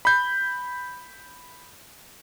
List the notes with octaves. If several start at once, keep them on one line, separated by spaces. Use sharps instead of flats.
B5 G6